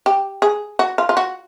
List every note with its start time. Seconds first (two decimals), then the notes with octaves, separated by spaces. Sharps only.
0.06 G4
0.42 G#4
0.79 F#4
0.98 F4
1.09 F4
1.17 F#4